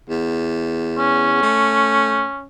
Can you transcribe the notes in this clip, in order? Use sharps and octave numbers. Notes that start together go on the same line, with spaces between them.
E2
C#4
A3